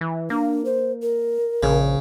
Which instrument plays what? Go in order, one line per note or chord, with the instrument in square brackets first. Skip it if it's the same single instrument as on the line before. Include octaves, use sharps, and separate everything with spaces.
[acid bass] E3
[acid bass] A#3 [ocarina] D4
[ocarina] C5
A#4
[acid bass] A#1 [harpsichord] C#3